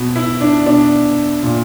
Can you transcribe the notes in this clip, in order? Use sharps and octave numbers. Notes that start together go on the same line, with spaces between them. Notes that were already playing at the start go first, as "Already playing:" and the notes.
Already playing: B2
E4
D4
B2 D4
A#2